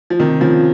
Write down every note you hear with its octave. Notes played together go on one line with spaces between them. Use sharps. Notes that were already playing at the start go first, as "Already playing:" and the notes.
F3
C3 D#3
C#3 F3